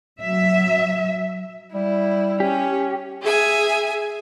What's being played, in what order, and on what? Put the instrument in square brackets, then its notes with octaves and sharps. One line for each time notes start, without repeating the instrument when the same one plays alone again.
[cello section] F#3 E5
[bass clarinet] G3 [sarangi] E4
[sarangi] C#4 [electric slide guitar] G4
[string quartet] G#4 E5 G#5